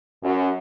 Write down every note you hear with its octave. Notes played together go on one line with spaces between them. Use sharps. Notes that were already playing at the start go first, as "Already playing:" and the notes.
F#2